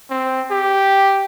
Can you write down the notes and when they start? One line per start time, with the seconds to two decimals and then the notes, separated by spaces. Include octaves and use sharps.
0.10 C4
0.51 G4